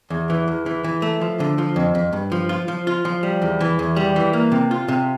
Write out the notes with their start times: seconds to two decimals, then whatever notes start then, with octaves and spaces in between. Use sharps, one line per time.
0.10 E2
0.30 E3
0.48 E2
0.66 E3
0.84 E3
1.02 A3
1.21 F3
1.40 D3
1.58 F3
1.76 F2
1.95 F2
2.13 G2
2.32 F3
2.49 F4
2.68 F3
2.87 F4
3.05 F3
3.23 G3
3.42 E2
3.61 E3
3.79 E2
3.96 G3
4.16 E3
4.33 A#3
4.52 C3
4.71 F4
4.88 C3